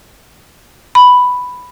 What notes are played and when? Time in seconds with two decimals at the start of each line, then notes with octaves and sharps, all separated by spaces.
0.95 B5